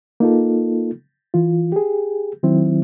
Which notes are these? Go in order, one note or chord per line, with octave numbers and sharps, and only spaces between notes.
A#3 D#4 F4 A4
E3 F4
G4 G#4
D#3 F#3 C4 E4